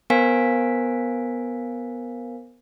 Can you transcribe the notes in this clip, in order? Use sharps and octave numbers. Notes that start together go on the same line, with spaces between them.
B3 A#4 C5 F5 G#5 B6